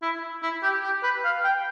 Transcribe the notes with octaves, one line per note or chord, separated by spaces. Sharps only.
E4
E4
G4
G4
B4
F5
G5